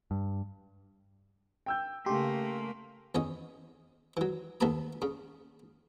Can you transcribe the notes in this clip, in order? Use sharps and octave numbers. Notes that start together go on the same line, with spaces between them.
G2
G5 E6 G6
C#3 A3 A#3 G4 C6
E2 C#4 D#5
E3 F#3
D#2 A3 B3 A4 A#5 D#6
C#3